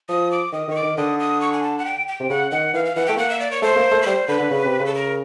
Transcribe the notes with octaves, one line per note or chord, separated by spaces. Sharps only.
F3 D#6
D6
D#3 D#6
D#3 C#6
D6
D#3
D3 D#6
D#6
C#6
G#5
A5
F#5
G5
G5
C3
C#3 F#5
D#3 F#5
E3 F5
F5
E3 F#5
A3 G5
A#3 F#5
E5
D5
C#5
A3 C5
A#3
A3
B4
G3 C5
D3 B4
D3
C#3
C3
C#3
A4
A#4